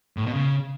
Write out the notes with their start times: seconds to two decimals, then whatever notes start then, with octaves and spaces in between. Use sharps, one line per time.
0.17 A2
0.25 B2
0.33 C#3